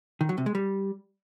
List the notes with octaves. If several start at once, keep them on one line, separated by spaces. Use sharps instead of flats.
D#3
F#3
C3
G#3
G3